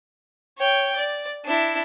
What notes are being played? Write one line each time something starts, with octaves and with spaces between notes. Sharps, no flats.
C#5 G5
D5
D4 E4